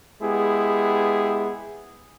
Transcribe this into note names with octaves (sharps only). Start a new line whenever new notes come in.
G#3 B3 E4 G4 G#4